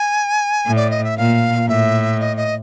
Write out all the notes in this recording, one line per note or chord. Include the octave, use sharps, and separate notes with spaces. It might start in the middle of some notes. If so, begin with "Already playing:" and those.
Already playing: G#5
A2
D5
D#5
E5
A#2 F5
A2 E5
D#5
D#5